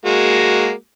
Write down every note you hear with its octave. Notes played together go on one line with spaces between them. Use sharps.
G#3 A#3 F#4